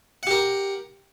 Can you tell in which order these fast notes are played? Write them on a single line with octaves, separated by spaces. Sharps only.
F#5 G4 A#4